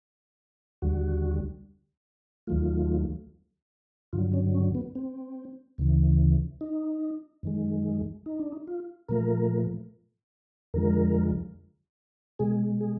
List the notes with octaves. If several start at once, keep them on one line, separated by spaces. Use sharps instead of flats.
D#2 D3 G3 F#4
D#2 D#3 F#3 A3 F4
G2 D3 F#3 F4
C#4
C#4
B3
C4
D2 C#3 E3
D#4
F#2 D#3 G#3
D#4
D4
D#4
F4
A#2 F3 A3 A#4
F2 D3 F3 G#3 A#4
B2 G#3 G#4
G#4